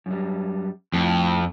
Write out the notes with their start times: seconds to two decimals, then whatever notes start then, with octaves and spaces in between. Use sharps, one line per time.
0.06 F#2 G3
0.93 F2 A2